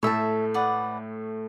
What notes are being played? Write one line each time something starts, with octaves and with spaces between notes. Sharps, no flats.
A2 A3 C#5 E5 A5
B4 D5 F#5